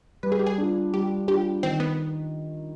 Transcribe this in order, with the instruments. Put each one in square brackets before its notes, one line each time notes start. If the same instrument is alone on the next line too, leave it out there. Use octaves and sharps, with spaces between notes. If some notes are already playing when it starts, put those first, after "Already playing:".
[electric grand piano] G3 [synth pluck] B4
[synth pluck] G#4
G4
G#4
[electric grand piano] D4 F4
[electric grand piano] G3 [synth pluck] G4
[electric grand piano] D4 F4 [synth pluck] G4
[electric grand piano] D#3 [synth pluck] C4
[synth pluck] B3